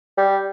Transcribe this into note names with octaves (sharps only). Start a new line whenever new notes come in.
G3